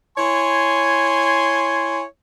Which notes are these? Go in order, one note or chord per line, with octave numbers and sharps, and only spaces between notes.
E4 C#5 G#5 C6